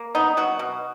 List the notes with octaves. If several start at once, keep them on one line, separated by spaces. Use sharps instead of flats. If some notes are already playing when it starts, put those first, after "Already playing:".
Already playing: A#3
B3 D#4
F#3 F#4
B2